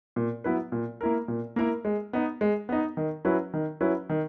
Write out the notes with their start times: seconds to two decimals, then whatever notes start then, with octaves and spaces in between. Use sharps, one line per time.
0.16 A#2
0.44 F#3 B3 E4 B4
0.72 A#2
1.01 A#3 E4 A#4
1.28 A#2
1.56 A#3 E4 A#4
1.85 G#3
2.13 B3 D#4
2.41 G#3
2.69 B3 D#4
2.97 D#3
3.25 F#3 C#4 E4 B4
3.54 D#3
3.81 F#3 C#4 E4 B4
4.09 D#3